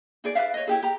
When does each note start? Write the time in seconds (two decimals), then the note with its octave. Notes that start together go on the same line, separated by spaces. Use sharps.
0.24 D#4 G#4 D5
0.35 B4 D5 E5 F5
0.54 C#5 D#5
0.67 E4 G4 G#4
0.83 G4 A#5